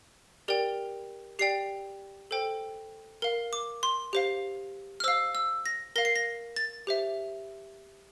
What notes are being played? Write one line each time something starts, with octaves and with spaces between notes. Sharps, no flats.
G4 A#4 D5 G5
G4 D5 G5 C7
A4 C5 G5
A#4 F5
D6
C6
G4 C5 F5
F6
C5 F5 E6
E6
A#6
A#4 F5 A#6
C7
A#6
A6
G4 C5 E5